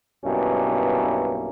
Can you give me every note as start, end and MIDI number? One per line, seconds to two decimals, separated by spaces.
0.24 1.50 35
0.24 1.50 43
0.24 1.50 47
0.24 1.50 58
0.24 1.50 61
0.24 1.50 64